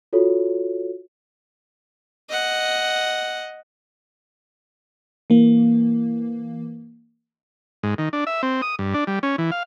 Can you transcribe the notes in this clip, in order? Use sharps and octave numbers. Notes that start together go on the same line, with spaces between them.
F4 F#4 A4 C#5
D#5 F#5
E3 A#3
G#2
D#3
D4
E5
C4
D#6
G2
D4
G3
C#4
E3
F5